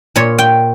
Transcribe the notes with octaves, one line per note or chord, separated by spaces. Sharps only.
A#2 C#5
G5